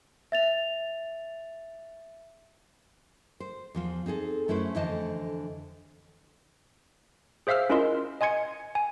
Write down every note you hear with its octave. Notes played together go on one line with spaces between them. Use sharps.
E5 A6 F7
C5
E2 F3 F4
C4 D#4 G#4 A4
F#2 A3 C#4 E4 B4 C5
F2 D3 E3 C5 D#5 A5
G#4 C5 E5 F5 E6 F6
C#4 E4 F4 A#4 D#5 C6
D#5 G#5 C6 G#6 C#7
G#5